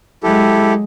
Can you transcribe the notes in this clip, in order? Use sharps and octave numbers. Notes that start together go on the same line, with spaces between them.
F#3 G#3 E4 G4 A4